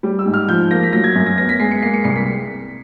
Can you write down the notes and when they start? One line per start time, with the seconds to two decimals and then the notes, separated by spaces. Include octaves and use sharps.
0.03 G3
0.19 E6
0.26 G#2
0.34 F6
0.48 F3 G6
0.71 A#3 A#6
0.83 B6
0.93 F#3 A#6
1.04 G#6
1.15 F#2
1.26 A#6
1.38 B3 A#6
1.49 B6
1.60 G#3 C7
1.71 C#7
1.82 A#3 C7
1.94 C#7
2.04 C2 C7
2.16 B6